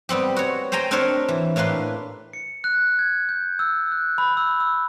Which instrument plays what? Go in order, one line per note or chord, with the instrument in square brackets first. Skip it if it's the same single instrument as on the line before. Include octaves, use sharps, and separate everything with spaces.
[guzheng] G3 B3 C4 G4
F#4 C#5
C5 G5 G#5 A#5 C6
C4 D4 G4 A#4 C5 C#5
E3
A2 A#3 D4 B4 C6
[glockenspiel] C#7
F#6
G#6
G6
E6
F#6
B5
E6
E6